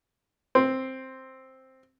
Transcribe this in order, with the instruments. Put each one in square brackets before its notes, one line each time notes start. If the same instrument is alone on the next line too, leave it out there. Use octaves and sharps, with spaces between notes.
[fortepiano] C4 C6